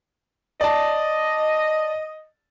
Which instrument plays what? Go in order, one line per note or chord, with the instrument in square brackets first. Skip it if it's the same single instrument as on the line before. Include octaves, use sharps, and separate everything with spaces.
[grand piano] D5 A5 [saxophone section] D#5